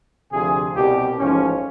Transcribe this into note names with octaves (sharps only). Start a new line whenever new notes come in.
D2 C3 F3 G#4
C2 B2 G3 G4
A1 G#2 F3 C#4